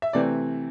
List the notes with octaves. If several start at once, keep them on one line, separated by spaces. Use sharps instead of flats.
E5
C3 E3 A3 C4 D5